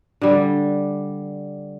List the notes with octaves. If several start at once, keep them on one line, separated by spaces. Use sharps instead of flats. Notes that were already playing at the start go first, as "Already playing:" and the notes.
D3 G3